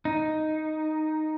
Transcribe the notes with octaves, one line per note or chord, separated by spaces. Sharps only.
D#4